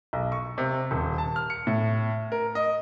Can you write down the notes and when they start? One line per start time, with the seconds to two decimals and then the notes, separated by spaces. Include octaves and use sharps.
0.13 B1
0.32 C#6
0.58 C3
0.91 D#1
1.18 A5
1.36 F6
1.50 C#7
1.67 A2
2.32 A#4
2.55 D#5